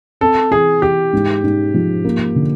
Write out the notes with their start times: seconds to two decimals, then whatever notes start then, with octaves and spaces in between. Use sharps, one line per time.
0.21 C4 A4
0.51 E3 G#4
0.82 E3 G4
1.13 G#2
1.43 G#2
1.74 F3
2.05 A#3
2.35 D3